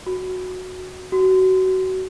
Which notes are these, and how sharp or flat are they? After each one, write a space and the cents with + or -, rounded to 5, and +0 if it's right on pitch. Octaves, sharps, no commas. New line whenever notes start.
F#4 -5
F#4 +25